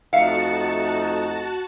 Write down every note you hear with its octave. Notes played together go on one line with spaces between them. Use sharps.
F2 A3 D#4 F#4 E5 F5 A5 C#7